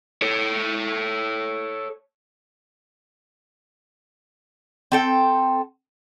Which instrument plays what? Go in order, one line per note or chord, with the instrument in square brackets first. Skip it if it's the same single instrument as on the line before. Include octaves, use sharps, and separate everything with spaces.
[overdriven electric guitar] A4 C#5
[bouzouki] C4 A4 G5